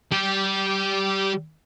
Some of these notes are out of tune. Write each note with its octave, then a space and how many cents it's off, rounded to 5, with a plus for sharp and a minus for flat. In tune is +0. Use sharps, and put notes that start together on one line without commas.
G3 -20 G4 -5